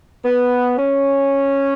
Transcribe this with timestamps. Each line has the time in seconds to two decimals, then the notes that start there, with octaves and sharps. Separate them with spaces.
0.24 B3
0.77 C#4